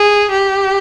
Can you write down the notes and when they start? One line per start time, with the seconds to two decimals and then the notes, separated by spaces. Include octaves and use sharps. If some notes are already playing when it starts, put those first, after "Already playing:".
Already playing: G#4
0.31 G4